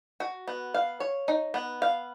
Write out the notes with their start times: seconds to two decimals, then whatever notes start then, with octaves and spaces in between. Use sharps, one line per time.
0.20 F#4
0.48 B3
0.74 F5
1.00 C#5
1.28 D#4
1.54 B3
1.82 F5